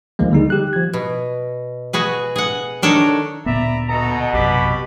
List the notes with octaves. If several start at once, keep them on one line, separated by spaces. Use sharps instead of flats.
D2 D#3 F3 G#3 A#3
D3 G3 D#4 G#4
G4 F#6
F3 G#6
B2
F#4 G#4 B4
G#4 F#5
D#3 D4 A4 C#5 A#5
D2 A#2 B3 D5 E5 A#5 B5
B2 A4 D#5 A#5
A#1 F#2 C3 D4 G4 B5